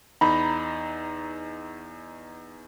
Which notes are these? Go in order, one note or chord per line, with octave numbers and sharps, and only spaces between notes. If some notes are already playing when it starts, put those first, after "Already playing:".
E2 D#4 A#5 B5